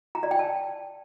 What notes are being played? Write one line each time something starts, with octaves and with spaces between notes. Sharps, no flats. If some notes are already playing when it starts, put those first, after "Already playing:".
A#5
D5
G5
A5